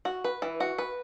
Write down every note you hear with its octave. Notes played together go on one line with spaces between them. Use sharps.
F#4
B4
E3
F#4
B4